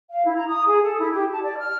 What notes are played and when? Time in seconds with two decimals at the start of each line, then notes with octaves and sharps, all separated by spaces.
0.10 F5
0.24 E4
0.35 A#5
0.48 D#6
0.66 G#4
0.83 A4
0.99 E4
1.12 G4
1.30 A5
1.43 D5
1.57 F6